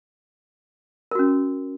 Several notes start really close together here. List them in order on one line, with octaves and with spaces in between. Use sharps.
A#4 F#4 C#4